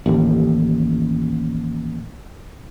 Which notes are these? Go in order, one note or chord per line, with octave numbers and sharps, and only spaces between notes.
A1 D#2